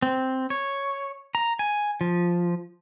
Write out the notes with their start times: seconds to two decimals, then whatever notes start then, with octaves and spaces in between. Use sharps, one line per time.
0.02 C4
0.50 C#5
1.35 A#5
1.59 G#5
2.01 F3